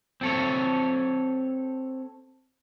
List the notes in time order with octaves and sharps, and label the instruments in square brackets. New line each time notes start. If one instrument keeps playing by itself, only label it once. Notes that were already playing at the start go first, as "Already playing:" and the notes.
[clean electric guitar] C4 A4 C#5